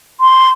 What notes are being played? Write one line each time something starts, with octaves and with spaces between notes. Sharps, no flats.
C6